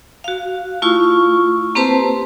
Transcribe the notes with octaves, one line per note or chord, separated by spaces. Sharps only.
F#4 F5
A3 E4 F4 C#6
A#3 C4 G4 B4 C5 A5